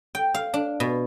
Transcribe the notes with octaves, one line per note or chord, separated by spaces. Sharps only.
G5
F5
D4
B2